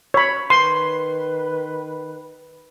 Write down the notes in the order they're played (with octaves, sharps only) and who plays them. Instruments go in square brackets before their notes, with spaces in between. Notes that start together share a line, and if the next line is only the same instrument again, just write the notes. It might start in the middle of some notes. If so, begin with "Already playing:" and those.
[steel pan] C#5 B5
[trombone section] D#3 B4 [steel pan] C6